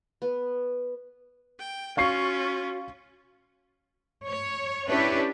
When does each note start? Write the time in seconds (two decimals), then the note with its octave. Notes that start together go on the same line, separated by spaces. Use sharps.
0.22 B3
1.59 G5
1.97 C#4 F4 F#4 F5 C#6 C7
4.26 C#5
4.89 C#4 D4 E4 G4 B4 C#5